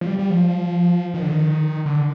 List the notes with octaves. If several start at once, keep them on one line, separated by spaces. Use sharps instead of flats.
F3
G3
G3
F3
D#3
D3
D#3
D3